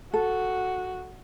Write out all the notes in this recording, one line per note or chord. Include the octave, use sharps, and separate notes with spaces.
F#4 A4